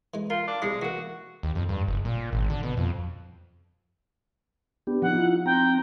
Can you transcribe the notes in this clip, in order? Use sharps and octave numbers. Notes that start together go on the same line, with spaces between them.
E3 G#3
F4 A#4
D4
C3 G3 G#3 E4
E3 A#3 F#4
D#2
F2
G2
F#1
A#2
G#1
D3
B2
F2
B3 D4 G4
F3 D#4 F#5
E4 F4
C4 G5 A#5